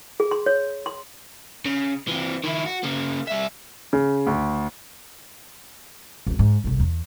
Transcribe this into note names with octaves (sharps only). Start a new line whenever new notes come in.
G#4
C6
C#5
C6
C#3
E3 C4
D#3 E4
F#4
C#3 A#3
G3 E5
C#3
D2
G#1 D#2
G#2
G1 C2
E2